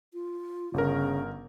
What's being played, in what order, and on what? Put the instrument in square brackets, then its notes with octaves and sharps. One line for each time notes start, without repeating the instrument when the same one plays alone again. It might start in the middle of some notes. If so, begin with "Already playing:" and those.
[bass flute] F4
[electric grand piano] G1 A#4 [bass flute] C#3